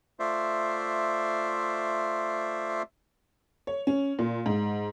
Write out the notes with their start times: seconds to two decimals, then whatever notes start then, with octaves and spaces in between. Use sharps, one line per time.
0.19 A3 F4 C5 D5 E5
3.67 C#5
3.87 C#4
4.19 A#2
4.46 G#2